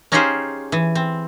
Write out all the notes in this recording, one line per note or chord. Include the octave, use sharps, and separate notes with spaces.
C#4 D#4 F4 G4 G#4 C5
E3
C4